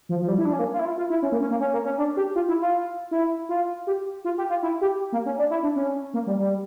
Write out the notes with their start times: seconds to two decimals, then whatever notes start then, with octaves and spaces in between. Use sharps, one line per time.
0.09 F3
0.22 F3
0.28 G3
0.38 E4
0.45 D4
0.53 C#4
0.59 A#3
0.73 F4
0.79 E4
0.85 F4
0.98 F4
1.10 E4
1.23 C#4
1.32 A#3
1.41 C#4
1.51 A#3
1.61 C#4
1.73 A#3
1.85 C#4
1.98 D4
2.17 G4
2.35 F4
2.48 E4
2.61 F4
3.11 E4
3.49 F4
3.87 G4
4.25 F4
4.38 G4
4.50 F4
4.63 E4
4.81 G4
5.12 A#3
5.26 C#4
5.38 D4
5.50 E4
5.63 D4
5.76 C#4
6.14 A#3
6.27 G3
6.39 G3